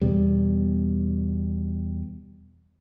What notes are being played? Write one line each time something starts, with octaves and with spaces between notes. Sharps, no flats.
E2 B2 G3